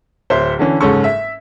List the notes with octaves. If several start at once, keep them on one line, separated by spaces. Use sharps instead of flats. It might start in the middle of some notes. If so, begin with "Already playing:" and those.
D1 C5 C#5 E5
D3 E3 C#4
F#1 G#2 C#4 A4 C#6
E5